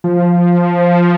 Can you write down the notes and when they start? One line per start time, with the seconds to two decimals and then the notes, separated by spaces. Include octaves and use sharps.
0.04 F3